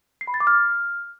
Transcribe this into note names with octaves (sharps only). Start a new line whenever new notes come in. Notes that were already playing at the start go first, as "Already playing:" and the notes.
C7
B5
A6
D6
F6